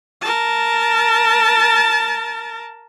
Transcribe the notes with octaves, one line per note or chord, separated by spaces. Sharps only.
A#4 A5